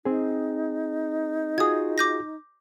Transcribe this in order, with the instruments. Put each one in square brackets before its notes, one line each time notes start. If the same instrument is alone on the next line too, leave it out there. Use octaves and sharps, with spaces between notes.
[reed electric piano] C4 G#4 [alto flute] D#4
[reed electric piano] F4 F#4 G#4 [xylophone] D#6 G#6
[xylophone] D6 G6 A#6